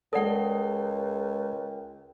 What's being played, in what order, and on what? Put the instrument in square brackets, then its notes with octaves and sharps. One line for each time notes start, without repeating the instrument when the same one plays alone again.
[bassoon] C#2 [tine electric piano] G#3 A5 [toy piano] A4 D5 F#5 [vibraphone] A#4 G5